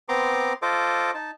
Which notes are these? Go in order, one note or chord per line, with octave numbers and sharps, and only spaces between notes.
B3 C4 A#5 C6 D6
F4 A4 C5 D#5 D6
D#4 A5